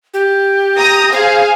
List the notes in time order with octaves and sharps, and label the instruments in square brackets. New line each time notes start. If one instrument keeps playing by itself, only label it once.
[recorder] G4
[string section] A#5 D#6 A#6
[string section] G#4 F5 [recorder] C5